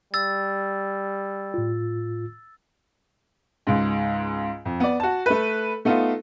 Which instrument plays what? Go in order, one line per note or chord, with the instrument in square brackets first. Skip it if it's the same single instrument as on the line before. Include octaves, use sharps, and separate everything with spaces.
[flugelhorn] G3 [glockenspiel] E6 A6
[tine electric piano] A2 F4
[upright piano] C#2 G#2
F2
B3 D5
F#4 A5
A3 B4
A3 B3 D#4 F4